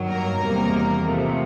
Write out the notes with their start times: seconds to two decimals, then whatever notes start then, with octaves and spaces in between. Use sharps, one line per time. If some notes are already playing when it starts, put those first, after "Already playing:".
Already playing: G2 D#3 F#3
0.09 A#3 A#4
0.41 E2 C3 D#3 G3 A#3
1.05 C3 F3 A3